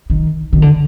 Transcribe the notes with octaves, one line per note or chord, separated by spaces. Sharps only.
D#3
D#3
D3